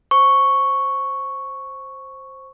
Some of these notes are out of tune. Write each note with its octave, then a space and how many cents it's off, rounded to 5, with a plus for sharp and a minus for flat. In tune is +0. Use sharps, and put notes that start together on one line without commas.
C5 +5 C#6 +0